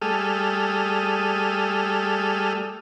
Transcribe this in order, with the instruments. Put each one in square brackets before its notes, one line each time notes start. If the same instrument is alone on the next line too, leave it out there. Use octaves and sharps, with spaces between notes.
[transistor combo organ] G3 A3 G#4 A4 D#6 F6